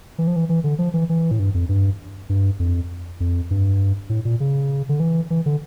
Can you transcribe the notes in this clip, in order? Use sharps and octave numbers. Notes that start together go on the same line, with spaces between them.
E3
F3
E3
E3
D3
F3
E3
E3
A2
G2
F2
G2
G2
F2
F2
G2
A2
A#2
C#3
D3
E3
E3
D3